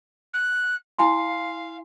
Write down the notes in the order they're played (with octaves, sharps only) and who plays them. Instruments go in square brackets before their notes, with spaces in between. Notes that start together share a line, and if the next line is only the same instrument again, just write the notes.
[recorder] F#6
[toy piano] E4 G#5 C6 [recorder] F5